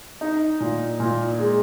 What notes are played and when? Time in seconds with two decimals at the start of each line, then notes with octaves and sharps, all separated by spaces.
0.21 D#4
0.60 A#2
1.00 A#2
1.39 G#3